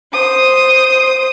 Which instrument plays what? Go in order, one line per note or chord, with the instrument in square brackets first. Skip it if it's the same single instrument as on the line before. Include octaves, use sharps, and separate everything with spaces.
[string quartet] C5 D#6